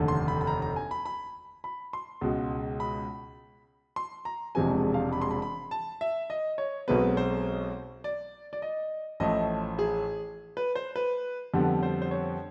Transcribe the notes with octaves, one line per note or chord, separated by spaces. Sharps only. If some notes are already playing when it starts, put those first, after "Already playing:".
Already playing: F1 D#2 D3
C6
B5
B5
A#5
A#5
G#5
B5
B5
B5
C6
C#2 B2 G#3
B5
C6
A#5
E1 E2 C3 F3 G#3 G#5
F5
B5
C6
B5
B5
A5
E5
D#5
C#5
B1 B2 G#3 C4 B4
C5
D5
D5
D#5
A1 A2 F3 A3 D#5
G#4
B4
C5
B4
F2 D3 G3 B3
C5
C5
C#5